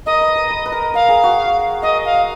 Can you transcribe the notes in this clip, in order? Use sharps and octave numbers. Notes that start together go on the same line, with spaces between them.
A#4 D#5
B4
A#4
B4
B4
A#4
A#4 F5
G#4
F#4
A#4 D#5
F5